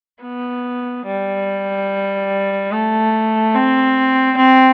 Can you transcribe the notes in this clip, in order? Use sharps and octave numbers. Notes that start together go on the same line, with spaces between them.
B3
G3
A3
C4
C4